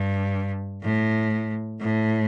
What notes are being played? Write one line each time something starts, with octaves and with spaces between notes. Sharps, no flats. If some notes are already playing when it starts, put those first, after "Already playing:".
Already playing: G2
A2
A2